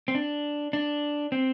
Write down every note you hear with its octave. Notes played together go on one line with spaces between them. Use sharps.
C4
D4
D4
C4